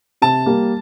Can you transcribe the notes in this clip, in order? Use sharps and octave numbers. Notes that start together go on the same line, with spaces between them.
C3 A5
G3 A#3